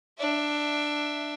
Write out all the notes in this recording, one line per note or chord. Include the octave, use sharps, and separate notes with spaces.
D4 E5